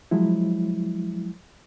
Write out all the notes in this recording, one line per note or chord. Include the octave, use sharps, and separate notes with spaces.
F3 F#3 G#3 E4